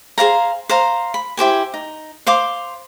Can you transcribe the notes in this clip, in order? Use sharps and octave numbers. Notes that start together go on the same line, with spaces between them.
G#4 C5 F5 A#5
C5 F5 A#5
B5
E4 G4 C5 G#5
D#4
C5 F5 C6 D6